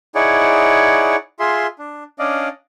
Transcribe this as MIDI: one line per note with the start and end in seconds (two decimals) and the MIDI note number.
0.15 1.16 63
0.15 1.16 64
0.15 1.16 68
0.15 1.16 73
0.15 1.16 74
0.15 1.16 78
1.40 1.67 65
1.40 1.67 68
1.40 1.67 76
1.40 1.67 84
1.79 2.04 62
2.19 2.49 61
2.19 2.49 62
2.19 2.49 74
2.19 2.49 75
2.19 2.49 77